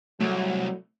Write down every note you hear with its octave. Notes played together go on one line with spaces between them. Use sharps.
C2 F#3 A3